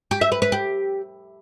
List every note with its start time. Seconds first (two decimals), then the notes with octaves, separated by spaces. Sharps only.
0.11 G4
0.21 E5
0.32 B4
0.42 B4
0.52 G4